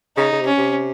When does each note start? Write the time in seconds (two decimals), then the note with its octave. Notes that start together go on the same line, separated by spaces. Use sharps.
0.17 C#3 D#4
0.32 C#3
0.41 C3
0.47 C#4
0.58 C3